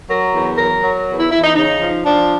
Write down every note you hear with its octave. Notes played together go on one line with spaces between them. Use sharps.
F#3 A#4
E2
F#3 A#4
F#3
E2
E4
E2 E4
D#4
C#3 D#4
F3
F3 D4